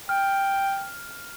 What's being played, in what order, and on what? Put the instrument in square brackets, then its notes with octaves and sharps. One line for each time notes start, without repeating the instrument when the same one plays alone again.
[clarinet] G5 [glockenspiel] F6